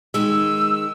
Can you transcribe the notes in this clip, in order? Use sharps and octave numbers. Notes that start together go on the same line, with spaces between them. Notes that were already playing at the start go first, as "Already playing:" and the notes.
D#3 G#3 E6